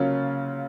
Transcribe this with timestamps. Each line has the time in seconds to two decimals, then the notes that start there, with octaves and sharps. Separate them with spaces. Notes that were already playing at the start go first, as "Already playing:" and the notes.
Already playing: C#3 F#3 A#3 C#4 F4